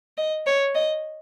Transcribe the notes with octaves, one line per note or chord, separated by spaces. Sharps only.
D#5
C#5
D#5